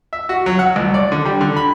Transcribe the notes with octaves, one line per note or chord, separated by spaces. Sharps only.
E5
F#4
F#3
F#5
C2
D5
D3
G3
D3
B5